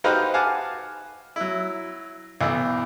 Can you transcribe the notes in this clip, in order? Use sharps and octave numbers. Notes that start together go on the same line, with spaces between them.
D#4 F#4 G4 B4 C5 F5
F5 F#5 G#5 A5 D6
F#3 E4
B1 E3 B3